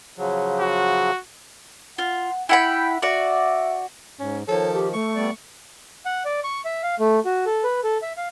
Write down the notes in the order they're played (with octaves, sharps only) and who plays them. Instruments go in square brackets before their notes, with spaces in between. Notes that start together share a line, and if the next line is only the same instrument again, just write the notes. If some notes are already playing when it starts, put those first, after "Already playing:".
[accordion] C#3 F3 F#3
[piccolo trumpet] F#4
[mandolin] F4 [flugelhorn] F#5
[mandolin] E4 F#5 B5 [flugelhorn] G5
[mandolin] F#4 D5 [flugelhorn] E5
[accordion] G#2 [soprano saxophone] C#4
[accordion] D#3 F3 [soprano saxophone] A4 [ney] C#5
[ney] G4
[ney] A3 [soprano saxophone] C#6
[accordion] G3 B3 D5
[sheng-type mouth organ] F#5
D5
C#6
E5
F5
A3
F#4
A4
B4
A4
E5
F5